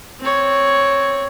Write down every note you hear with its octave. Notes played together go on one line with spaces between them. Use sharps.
C4 C#5